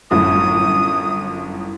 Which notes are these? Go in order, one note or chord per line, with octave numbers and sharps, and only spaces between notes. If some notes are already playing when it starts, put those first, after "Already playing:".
G1 F#2 A2 D#6